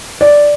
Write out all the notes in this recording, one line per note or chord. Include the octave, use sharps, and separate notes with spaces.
D5